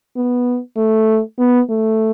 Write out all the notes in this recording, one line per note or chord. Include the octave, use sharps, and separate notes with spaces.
B3
A3
B3
A3